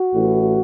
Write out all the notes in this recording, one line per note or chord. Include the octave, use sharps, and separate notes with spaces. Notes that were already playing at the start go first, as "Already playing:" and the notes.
Already playing: F#4
A1 A2 E3